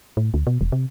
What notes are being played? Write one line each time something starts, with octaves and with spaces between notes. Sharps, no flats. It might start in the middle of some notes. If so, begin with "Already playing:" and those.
A2
D2
B2
E1
C3